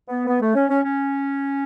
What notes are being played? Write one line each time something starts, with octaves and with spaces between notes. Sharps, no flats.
B3
B3
A3
C#4
C#4
C#4